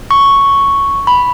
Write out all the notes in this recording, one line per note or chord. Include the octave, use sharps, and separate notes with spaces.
C#6
B5